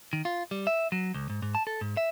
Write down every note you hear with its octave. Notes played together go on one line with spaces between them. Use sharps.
D#3
F4
G3
E5
F#3
C#2
G#2
G#2
A5
A4
G#2
E5